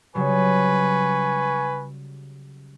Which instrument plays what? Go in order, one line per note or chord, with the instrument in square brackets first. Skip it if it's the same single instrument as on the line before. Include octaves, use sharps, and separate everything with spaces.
[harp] C#3 F#3 G3 [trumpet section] B4 G#5 C#6